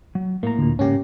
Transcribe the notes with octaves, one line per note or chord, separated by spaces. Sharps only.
F#3
A2 A#3 A#5
D2 A#2
G#2 C#3 A#3 C#4 G4